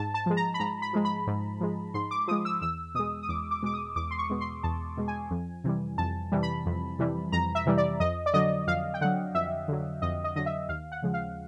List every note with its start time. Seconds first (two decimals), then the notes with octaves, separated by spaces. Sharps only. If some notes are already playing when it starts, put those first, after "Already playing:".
Already playing: G#2 A5
0.14 A5
0.26 F3 G#3
0.37 A#5
0.54 B5
0.60 G#2 A#5
0.82 B5
0.93 F3 G#3
1.05 B5
1.27 G#2
1.61 F3 G#3
1.94 G#2 C6
2.11 D6
2.28 F3 G#3 D#6
2.45 E6
2.61 E2 E6
2.95 B2 G#3 D#6
3.23 D#6
3.29 E2 D6
3.51 D6
3.63 B2 G#3 D6
3.74 D#6
3.96 E2 D6
4.11 C6
4.18 C#6
4.30 B2 G#3
4.41 C6
4.63 E2 A5
4.97 B2 G#3
5.08 G#5
5.31 F2
5.64 C3 E3 G3
5.98 F2 A5
6.32 C3 E3 G3
6.43 B5
6.66 F2
6.99 C3 E3 G3
7.32 F2 A#5
7.55 E5
7.66 C3 E3 G3
7.78 D5
8.00 F2 D#5
8.26 D5
8.34 D3 F#3 D#5
8.67 F2 F5
8.94 G5
9.01 D3 F#3 F#5
9.35 F2 E5
9.68 D3 F#3
10.02 F2 D#5
10.24 D#5
10.36 D3 F#3 D#5
10.46 E5
10.69 D#2 F5
10.92 F#5
11.03 C#3 F3 G#3
11.14 F5